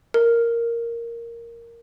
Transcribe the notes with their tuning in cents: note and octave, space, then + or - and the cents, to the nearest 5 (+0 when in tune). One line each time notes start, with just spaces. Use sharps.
A#4 +0